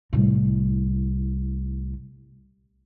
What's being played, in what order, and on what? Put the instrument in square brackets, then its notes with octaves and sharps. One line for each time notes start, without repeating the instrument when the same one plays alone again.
[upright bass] C2 A2